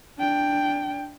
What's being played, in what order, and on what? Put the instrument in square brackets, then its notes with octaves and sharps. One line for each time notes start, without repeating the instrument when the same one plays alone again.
[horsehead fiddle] D4 G5